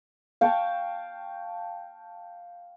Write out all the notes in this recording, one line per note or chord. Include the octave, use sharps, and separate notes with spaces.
F5 G5 A5 C#6